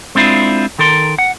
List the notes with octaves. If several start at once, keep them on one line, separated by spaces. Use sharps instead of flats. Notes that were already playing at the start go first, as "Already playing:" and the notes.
G#3 C4 D4 E4 F4
D#3 A4 A#4 C6
F#5